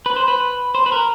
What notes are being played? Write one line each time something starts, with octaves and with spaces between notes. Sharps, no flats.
B4
C5
B4
C5
B4
A#4